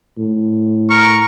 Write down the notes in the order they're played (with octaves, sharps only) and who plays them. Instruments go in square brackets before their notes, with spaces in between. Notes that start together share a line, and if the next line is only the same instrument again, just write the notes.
[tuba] A2
[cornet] A#4 [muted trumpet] C#6